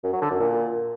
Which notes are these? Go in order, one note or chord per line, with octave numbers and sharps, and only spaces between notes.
F#2
F#3
D3
F#2
A#2